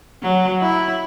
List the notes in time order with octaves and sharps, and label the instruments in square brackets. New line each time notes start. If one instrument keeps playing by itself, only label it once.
[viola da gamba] F#3
E4